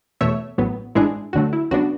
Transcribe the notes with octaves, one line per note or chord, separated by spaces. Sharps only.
E2 B2 A3 C#5 E5
A1 A2 F#3 B3
A1 G#2 G#3 D4 E4 G#4
D2 D3 F#3 A3 F#4
E4
C#2 C#3 F#3 B3 D4 F#4